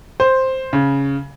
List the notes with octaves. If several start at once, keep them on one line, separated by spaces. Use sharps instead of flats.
C5
C#3